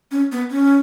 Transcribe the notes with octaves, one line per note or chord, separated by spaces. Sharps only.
C#4
B3
C#4